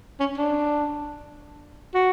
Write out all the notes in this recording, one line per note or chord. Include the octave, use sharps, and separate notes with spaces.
C#4
D4
F#4